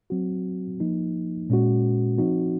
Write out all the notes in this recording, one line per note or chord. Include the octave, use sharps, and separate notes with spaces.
F#3 C4 F#4
F3 A#3 D#4
A#2 G#3 C#4 F#4
F3 C4 D#4 F#4